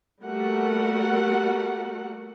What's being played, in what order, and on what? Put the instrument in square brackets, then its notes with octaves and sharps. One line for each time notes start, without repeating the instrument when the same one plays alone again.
[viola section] G3 A3 A#3 F#4 A#4 F#5